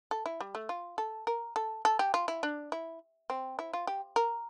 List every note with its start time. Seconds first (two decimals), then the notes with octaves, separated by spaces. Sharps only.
0.11 A4
0.26 E4
0.41 G3
0.55 A3
0.69 F4
0.98 A4
1.27 A#4
1.56 A4
1.85 A4
1.99 G4
2.14 F4
2.28 E4
2.43 D4
2.72 E4
3.30 C4
3.59 E4
3.73 F4
3.87 G4
4.16 A#4